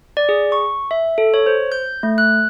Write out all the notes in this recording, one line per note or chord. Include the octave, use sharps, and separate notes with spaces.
D5
G#4
C#6
E5
A4
C#5
C5
G6
A3
F#6